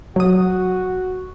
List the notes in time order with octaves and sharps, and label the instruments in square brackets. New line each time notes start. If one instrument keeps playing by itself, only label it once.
[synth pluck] F#3 D#6 [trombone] F#4